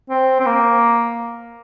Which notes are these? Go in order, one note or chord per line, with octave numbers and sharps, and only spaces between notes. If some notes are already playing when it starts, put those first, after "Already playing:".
C4
C4
A#3